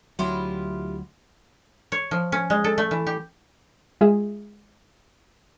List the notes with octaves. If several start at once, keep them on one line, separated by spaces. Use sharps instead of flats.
D2 F#3 E4 F4 G4
C#5
F3
C#4
G#3
A4
A3
E3
G4
G#3 F4 G#4 E5